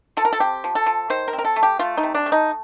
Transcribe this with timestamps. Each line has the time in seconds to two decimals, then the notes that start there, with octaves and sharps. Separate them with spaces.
0.17 F3 A4
0.25 A#4
0.33 A4
0.40 C4 G4
0.64 F3
0.75 A4
0.86 F3
1.10 D#3 C5
1.28 A#4
1.33 C4
1.38 A#4
1.45 A4
1.56 A3
1.63 G4
1.79 A3 F4
1.98 D#4
2.03 C3
2.15 D4
2.26 A3
2.32 D#4